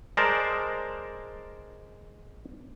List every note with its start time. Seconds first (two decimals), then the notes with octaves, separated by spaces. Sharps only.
0.17 G#3 A#4 C5 D5 A5